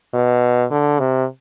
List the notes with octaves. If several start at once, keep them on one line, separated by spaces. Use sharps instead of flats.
B2
D3
C3